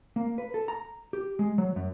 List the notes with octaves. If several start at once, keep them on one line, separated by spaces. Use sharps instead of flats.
A#3
B4
A4
A#5
G4
G#3
F#3
F#2